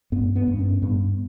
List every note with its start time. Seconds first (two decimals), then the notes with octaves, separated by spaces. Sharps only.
0.12 G2 B3
0.36 B3
0.47 G2
0.59 C#4
0.82 G2 B3